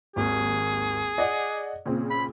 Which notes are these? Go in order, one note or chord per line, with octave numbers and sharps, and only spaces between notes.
G#1 D#2 G#4
D5 D#5 F#5
A#2 C#3 C4
B5